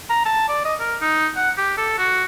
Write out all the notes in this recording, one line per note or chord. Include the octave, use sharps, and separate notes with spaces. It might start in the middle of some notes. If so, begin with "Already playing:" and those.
A#5
A5
D5
D#5
A#4
D#4
F#5
G4
A4
F#4